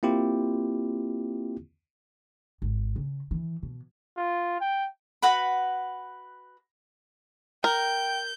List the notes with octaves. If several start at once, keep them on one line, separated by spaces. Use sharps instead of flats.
A#3 C4 E4 F4 G4
G#1
C#3
E3
B2
F4
G5
F#4 B4 F#5 B5
A#4 G5 G6